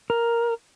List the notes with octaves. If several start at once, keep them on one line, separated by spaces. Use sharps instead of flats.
A#4